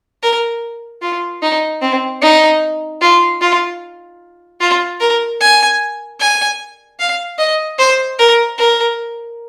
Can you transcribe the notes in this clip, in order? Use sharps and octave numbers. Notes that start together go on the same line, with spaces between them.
A#4
F4
D#4
C4
D#4
F4
F4
F4
A#4
G#5
G#5
F5
D#5
C5
A#4
A#4